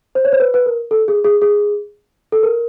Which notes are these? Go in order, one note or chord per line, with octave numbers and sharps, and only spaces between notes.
C5
C#5
C5
B4
B4
A#4
A4
G#4
G#4
G#4
A4
A#4